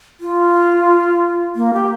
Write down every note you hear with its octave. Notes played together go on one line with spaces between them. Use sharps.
F4
A#3
G4